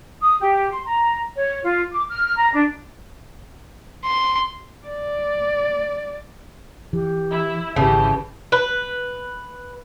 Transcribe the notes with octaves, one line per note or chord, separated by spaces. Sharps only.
D#6
G4
C6
A#5
C#5
F4
D6
F6
A#5
D4
C6
D5
E3 G4
E4
G#1 C#3 E3 G4 A5
B4